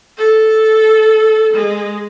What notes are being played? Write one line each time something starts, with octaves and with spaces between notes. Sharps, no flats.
A4
G#3